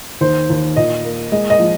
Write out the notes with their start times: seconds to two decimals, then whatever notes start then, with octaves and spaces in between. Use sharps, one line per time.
0.21 D#2 C5
0.50 D#2
0.76 A#2 D#5
1.04 A#3
1.32 G#3 D#5
1.50 D#5
1.60 F3